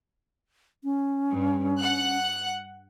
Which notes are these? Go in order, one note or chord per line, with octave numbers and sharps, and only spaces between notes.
C#4
G2
F#5 F#6